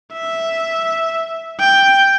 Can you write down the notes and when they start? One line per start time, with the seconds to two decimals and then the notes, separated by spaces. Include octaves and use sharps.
0.13 E5
1.60 G5